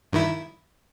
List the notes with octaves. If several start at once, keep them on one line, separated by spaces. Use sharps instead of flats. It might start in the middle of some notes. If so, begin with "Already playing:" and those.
G2 D#3 E4